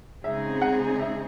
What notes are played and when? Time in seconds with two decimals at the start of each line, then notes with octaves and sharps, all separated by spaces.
0.24 C#3 G#3 C4 D#4 G#4 E5
0.62 F#5
0.99 E5